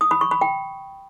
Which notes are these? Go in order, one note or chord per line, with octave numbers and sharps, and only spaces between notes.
D#6
B5
C#6
B5
G5